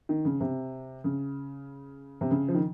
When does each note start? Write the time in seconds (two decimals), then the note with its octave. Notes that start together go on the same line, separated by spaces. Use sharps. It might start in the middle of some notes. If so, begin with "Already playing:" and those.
0.09 D#3
0.25 C#3
0.40 C3
1.04 C#3
2.21 C3
2.31 C#3
2.48 F3
2.55 D#3